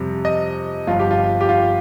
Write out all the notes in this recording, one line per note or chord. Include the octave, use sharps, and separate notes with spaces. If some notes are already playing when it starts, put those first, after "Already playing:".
Already playing: F2 C3 G3
D#5
G1 G2 F3 F4
G4
F4
G4
F4